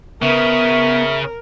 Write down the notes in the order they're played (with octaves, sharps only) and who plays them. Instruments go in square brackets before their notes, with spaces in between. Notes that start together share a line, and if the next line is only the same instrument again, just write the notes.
[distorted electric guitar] C#3 [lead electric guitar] B3 [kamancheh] A#4 [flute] E5